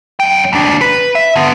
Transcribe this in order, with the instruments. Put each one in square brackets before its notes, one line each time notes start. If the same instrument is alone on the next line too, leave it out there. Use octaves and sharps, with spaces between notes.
[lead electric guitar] F#2 G5
D#2 D4
B4
E5
D3 B3